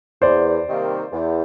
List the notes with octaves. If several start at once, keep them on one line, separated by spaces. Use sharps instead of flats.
E2 C5 D5
C3 D#3 G3 A#3
E2